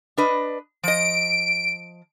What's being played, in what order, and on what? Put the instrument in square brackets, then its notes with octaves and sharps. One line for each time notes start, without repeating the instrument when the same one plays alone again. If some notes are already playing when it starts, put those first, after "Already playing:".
[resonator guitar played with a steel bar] D4 B4 D#5
[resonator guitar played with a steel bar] F3 D#5 [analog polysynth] D7